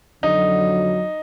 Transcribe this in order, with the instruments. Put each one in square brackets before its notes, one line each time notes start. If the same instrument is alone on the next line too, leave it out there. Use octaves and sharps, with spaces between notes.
[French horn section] F2 D3 F#3 [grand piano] D#4